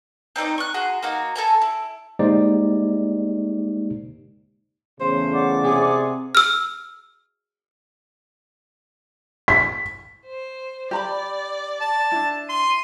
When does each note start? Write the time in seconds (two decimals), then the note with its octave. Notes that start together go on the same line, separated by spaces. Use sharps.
0.36 C4 D#4 A4 D5
0.58 C#6 F#6
0.74 F#4 G#4 A#5 C6
1.03 A#3 D#4 F#4
1.36 A4 G#5 A#5
1.62 E4
2.19 G#3 A#3 D#4 G4 C5 D5
5.00 E2 A2 C#3 C5
5.33 D5 F#5 D6
5.64 C3 G#4
6.35 E6 F6
9.48 B6
10.26 C5
10.91 G4 D5 A#5 B5
11.81 A5
12.12 D4 E4
12.49 C6 D#7